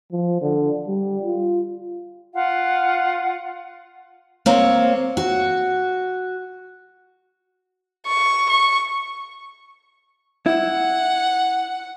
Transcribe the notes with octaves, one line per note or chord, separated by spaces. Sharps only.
F3
D3
G3
F4
F4 F5 F#5
A#3 C4 C#5
F#4
C#6
C#6
E4 F#5